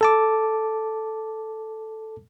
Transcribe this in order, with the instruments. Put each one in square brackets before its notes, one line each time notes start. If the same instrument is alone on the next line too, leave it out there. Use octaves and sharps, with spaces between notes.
[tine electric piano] A4 A5 D6